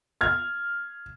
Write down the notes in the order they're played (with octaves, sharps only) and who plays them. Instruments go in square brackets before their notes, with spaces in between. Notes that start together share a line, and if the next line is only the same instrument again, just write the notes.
[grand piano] F6 G#6